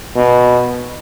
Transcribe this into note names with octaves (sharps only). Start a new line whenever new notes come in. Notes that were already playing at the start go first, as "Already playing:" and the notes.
B2